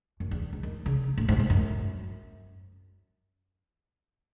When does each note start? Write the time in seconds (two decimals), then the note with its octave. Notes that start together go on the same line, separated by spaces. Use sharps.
0.20 F#2
0.31 E2
0.53 G#2
0.63 D#3
0.86 C#3
1.18 A2
1.29 G#2
1.40 F#2
1.50 F#2